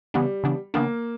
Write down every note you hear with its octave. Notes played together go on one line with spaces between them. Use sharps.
C#3 E3 G3 B3 D4
C#3 E3 B3 D4
C#3 E3 A#3 B3 D4